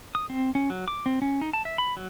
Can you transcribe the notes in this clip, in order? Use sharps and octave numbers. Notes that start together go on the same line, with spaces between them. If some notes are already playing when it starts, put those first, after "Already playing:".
D#6
C4
C#4
F#3
D6
C4
C#4
D#4
A5
E5
B5
F#3